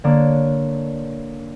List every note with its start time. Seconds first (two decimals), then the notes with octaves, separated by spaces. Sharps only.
0.04 D3 A#3 D4 C#5 D5